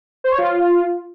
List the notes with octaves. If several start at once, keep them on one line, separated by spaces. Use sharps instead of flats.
C5
C#5
F4